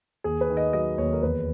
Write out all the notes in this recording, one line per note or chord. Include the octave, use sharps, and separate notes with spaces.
D#2 G#4
B4
D#3
D#5
F#3 D#5
D#2 C#5
A#4
E2 B4